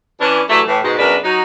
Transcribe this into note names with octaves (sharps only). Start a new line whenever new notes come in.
E3 C#4 D4
E3 F#3 G3 A3
A2 E3
G#2 B2 G#3
F#2 B2 G#3 D4 A#4 B4
F#3 D#4